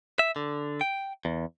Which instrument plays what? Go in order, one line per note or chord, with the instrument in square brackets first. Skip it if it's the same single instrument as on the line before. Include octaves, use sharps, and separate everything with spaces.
[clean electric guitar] E5
D3
G5
E2